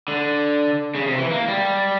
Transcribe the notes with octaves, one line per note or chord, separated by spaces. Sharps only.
D3
C#3
C3
E3
A#3
G3